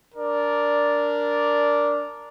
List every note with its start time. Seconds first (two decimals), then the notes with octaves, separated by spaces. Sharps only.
0.15 D4 A#4 D5